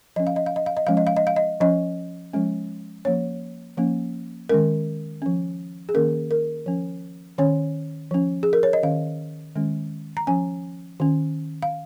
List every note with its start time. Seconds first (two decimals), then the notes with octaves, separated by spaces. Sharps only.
0.16 F3 C#4 D#5
0.27 F5
0.36 D#5
0.46 F5
0.56 D#5
0.66 F5
0.77 D#5
0.87 F3 G#3 C#4 F5
0.97 D#5
1.07 F5
1.17 D#5
1.27 F5
1.36 D#5
1.60 F3 C#4 D#5
2.33 F3 G#3 C#4
3.05 F3 A#3 C#4 C#5
3.77 F3 A#3 C#4
4.49 D#3 G#3 C#4 A#4
5.22 F3 C#4
5.89 G#4
5.94 D#3 A#3 C#4 A#4
6.31 A#4
6.66 F3 C#4
7.38 D#3 C#4 C#5
8.11 F3 C#4
8.43 G#4
8.53 A#4
8.63 C#5
8.73 D#5
8.83 D#3 C#4 F5
9.55 D#3 G#3 C#4
10.17 A#5
10.27 F3 C#4 G#5
11.00 D#3 C#4
11.62 F5